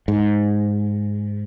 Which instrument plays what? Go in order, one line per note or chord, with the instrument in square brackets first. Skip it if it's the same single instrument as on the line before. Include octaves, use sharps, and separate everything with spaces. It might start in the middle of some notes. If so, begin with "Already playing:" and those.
[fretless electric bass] G#2